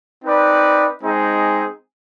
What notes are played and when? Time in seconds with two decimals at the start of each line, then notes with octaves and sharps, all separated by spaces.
0.23 C4 D#4 B4 D5
1.01 G#3 C4 D#4 G#4